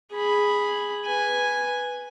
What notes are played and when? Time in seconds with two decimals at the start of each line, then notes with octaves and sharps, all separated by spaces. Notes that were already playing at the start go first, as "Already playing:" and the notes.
0.13 G#4 B5
1.05 B4 G#5